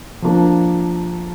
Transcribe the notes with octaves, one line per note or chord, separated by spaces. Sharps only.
F3 A#3 D4 F4